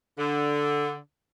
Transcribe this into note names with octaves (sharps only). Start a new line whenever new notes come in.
D3